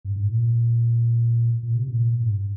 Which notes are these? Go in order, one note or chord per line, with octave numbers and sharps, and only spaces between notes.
G2
G#2
A#2
A#2
C3
A#2
A#2
G#2
G2